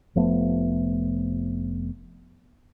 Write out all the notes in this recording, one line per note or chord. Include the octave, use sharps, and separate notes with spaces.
F1 F3 A3 B3